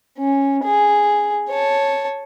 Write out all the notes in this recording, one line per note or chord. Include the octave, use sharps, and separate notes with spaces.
C#4
G#4
C#5 A5